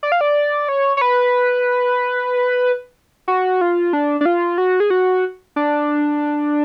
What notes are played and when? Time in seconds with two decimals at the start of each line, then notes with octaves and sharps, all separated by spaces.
0.03 D5
0.12 F5
0.21 D5
0.68 C#5
0.97 C#5
1.01 B4
3.28 F#4
3.61 F4
3.93 D4
4.21 D4
4.26 F4
4.58 F#4
4.80 G#4
4.90 F#4
5.56 D4